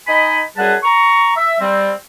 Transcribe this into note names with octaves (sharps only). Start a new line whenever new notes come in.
D#4 D#5 G#5 B5
F#2 G3 G#4 B4 F#5 A5
A#5 C#6
E5
G3 C4